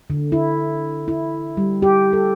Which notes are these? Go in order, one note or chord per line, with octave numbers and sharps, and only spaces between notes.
D3
E4
E4
G3
G4
A4